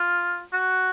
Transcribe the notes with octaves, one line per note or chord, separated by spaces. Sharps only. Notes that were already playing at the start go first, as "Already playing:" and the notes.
Already playing: F4
F#4